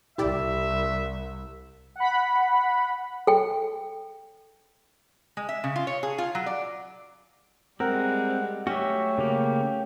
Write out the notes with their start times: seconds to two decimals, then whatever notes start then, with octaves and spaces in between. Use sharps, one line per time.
0.18 C2 E4 G4 D5 E5
1.96 F#5 B5
3.27 A4 G5
5.37 G#3
5.49 E5
5.64 C#3
5.76 F4
5.87 C#5
6.03 G#4
6.18 F4
6.35 F#3
6.46 D5
7.80 G3 G#3 C4 A#4 F#5
8.67 F#3 A3 C#4 F#4 G4 E5
9.18 C#3 A#3 G4